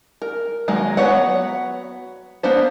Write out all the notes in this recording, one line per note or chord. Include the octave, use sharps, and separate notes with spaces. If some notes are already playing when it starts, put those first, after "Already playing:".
A#4
D#3 F#3 G#3 A#3
F#3 B3 C#5 F#5
A#3 B3 D4 C5